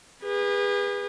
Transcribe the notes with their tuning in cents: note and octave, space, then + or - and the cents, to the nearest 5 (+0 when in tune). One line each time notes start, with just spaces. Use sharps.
G#4 -40 B4 -15